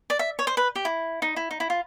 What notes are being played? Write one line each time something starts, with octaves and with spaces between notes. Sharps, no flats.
D5
E5
C#5
C5
B4
G4
E4
D#4
E4
D#4
E4
F4